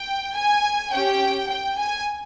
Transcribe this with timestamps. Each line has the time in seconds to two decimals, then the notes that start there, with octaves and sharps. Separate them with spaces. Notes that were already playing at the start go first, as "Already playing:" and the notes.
Already playing: G5
0.35 G#5
0.92 C#4 G4 G5
1.49 G5
1.77 G#5